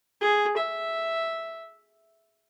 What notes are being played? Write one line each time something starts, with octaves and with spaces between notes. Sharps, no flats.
G#4
E5